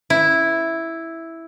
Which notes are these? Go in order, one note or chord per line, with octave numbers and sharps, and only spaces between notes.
E4